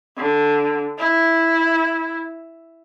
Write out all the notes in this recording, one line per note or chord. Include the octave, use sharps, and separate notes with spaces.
D3
E4